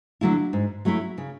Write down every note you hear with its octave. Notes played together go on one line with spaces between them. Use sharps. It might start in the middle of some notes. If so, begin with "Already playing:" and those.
D3 F#3 A3 E4
G#2
F#3 A3 C#4 E4
C#3